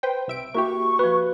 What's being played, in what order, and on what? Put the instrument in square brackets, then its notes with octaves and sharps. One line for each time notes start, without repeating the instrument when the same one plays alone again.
[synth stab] B4 C5 G5
C2 E5 D7
[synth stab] A#3 E4 G4 [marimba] F#4 [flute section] C#6
[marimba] F3 F#4 [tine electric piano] B4